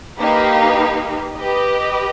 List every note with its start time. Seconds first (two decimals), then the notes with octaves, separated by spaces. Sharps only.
0.18 A#3 D#4 G4 B4
1.36 G4 B4 D#5